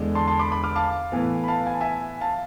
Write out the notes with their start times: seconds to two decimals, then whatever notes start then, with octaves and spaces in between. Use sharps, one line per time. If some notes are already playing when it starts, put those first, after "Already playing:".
Already playing: E2 D3 G#3 D4
0.15 A5 C6
0.27 A5 C6
0.39 B5 D6
0.52 B5 D6
0.64 D6 F6
0.76 F5 A5
1.12 A2 E3 B3
1.44 B5
1.48 F5 A5
1.66 G#5
1.74 A5
1.81 E5 G#5
2.21 F5 A5